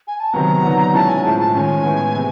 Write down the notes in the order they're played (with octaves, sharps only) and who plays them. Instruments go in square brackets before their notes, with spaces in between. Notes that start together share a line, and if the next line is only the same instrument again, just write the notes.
[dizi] G#5
A5
[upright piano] C3 D#3 F#3 B3 [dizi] A#5
[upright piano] D3 F#3 B3 D#4
[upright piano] B2 G#3 C#4 E4 [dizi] A5
[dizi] G#5
[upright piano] A2 F3 G#3 [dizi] A5
[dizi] A5
[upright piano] D#3 G#3 C#4 [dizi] G#5 A5
[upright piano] A2 E3 G#3 B3
C3